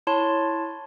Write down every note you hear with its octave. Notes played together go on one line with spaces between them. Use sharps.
E4 C#5 A5 C6